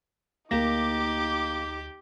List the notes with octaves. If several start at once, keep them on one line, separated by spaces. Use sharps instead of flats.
D2 A#3 D#4 G4 D6 A#6